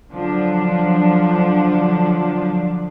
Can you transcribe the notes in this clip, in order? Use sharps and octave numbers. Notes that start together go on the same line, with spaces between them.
D3 F3 F#3 D4